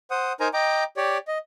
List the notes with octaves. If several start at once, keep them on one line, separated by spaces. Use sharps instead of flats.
C5 F#5 D#6
D#4 A#4 C5 G#5 A#5
D#5 G5 A#5 D6
G4 C#5 D5
D#5